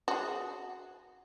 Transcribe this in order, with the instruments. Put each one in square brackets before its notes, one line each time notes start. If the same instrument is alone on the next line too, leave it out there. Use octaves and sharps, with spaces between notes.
[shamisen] F#4 G#4